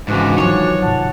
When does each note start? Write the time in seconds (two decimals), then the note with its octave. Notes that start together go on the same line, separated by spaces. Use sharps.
0.08 G#2 C#3 E3 A#3 D4 F#4
0.38 D#3 F3 F#3 C#5
0.82 G#2 C3 F#5 A5